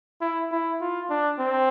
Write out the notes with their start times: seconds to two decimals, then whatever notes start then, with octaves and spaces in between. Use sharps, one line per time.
0.21 E4
0.52 E4
0.81 F4
1.10 D4
1.39 C4